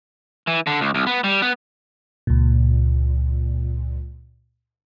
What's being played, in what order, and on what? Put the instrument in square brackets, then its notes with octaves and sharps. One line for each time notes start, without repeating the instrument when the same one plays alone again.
[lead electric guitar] E3
D3
C#2
C2
B3
G3
B3
[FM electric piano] C#2 A#2